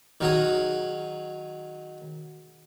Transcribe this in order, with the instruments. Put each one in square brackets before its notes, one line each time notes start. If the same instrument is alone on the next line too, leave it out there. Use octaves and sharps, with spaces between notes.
[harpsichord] D#3 F#3 G#4